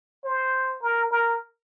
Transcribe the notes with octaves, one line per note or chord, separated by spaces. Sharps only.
C5
A#4
A#4